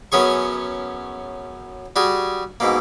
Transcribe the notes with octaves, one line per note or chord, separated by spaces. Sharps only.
F#2 B3 C#4 G#4 C#6
G3 F#4 G#4
G#2 B2 A#3